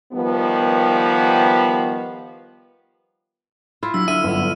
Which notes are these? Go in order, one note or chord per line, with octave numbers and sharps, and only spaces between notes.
D#3 F3 G3 B3
E4 F4
F#3 D4 E6 B6
D3 E5 E6 F6 D#7
G1 F#2 B3